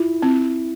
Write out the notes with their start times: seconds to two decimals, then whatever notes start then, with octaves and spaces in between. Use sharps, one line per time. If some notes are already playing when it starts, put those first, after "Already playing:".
Already playing: E4 F4
0.22 C4